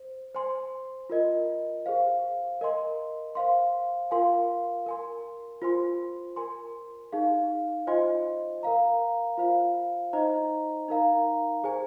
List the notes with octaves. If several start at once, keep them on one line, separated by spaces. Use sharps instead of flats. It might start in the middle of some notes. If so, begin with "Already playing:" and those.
Already playing: C5
C5 G#5 C6
F4 A#4 D#5
G#4 C5 F5
A#4 D#5 G#5 C6
C5 F5 C6
F4 A#4 F5 G#5 C6
A#4 G#5 C6
F4 C5 G#5 C6
A#4 G#5 C6
D#4 G#4 F5
F4 C5 D#5 G#5 C6
A#4 F5 A#5
F4 C5 F5
D#4 C5 D#5 A#5
D#4 A#4 F5 A#5
G#4 C5 G#5